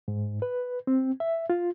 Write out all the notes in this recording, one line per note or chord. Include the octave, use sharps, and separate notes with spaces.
G#2
B4
C4
E5
F4